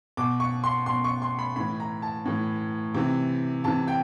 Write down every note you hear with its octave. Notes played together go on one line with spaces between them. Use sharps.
B2 D6
C#6
C6
B2 C6
C#6
C6
B5
A2 E3 B5
A#5
A5
A2 E3
C3 E3
C3 E3 A5
G5